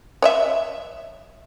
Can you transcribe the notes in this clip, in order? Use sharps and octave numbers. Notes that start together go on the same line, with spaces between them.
C#5 D#5 E5